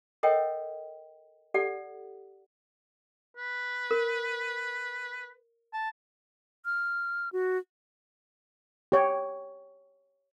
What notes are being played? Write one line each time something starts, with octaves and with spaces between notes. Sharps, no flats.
A4 A#4 C#5 D#5 F#5 G5
G4 A4 D5 F#5
B4
A#4
A5
F6
F#4
G4 C#5 G5